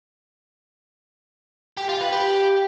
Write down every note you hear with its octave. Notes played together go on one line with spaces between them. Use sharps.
G4
F4
B4
G4